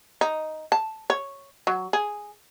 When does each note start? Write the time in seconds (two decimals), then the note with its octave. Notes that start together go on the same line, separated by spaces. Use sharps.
0.21 D#4
0.72 A5
1.10 C#5
1.67 F#3
1.93 G#4